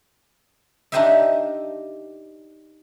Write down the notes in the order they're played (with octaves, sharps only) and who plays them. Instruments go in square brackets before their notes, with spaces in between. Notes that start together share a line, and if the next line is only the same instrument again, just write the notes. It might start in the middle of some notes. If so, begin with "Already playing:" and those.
[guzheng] D4 D#4 G4 C5 D#5 E5